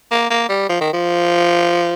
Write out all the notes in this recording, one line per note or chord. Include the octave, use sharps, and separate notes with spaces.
A#3
A#3
G3
F3
D#3
F3